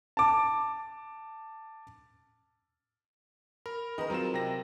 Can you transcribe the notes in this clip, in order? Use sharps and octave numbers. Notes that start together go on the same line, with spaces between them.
A5 D6
A#4 B5
D#3 G#4 B4 D#5 A#5
F#3 C4 F4 A#4 A#5 E7
C3 G5 A#6